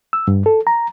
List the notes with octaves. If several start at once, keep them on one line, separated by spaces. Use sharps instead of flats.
E6
G2
A4
A#5